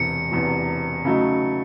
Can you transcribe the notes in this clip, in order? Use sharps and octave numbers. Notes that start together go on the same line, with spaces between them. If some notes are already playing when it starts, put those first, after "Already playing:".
Already playing: E1 E2 C3 C#7
E1 E2 C3
C#3 F#3 A3 D#4